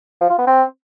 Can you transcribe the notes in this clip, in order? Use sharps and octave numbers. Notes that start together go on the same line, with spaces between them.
F3
F4
B3
C4